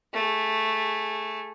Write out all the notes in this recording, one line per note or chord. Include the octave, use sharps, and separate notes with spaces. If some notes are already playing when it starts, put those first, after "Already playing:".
A3 G#4